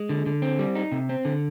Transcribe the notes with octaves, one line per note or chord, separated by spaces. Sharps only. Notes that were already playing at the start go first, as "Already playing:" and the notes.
Already playing: G#3
D3
D3
C4
G3
D#4
C3
C4
D3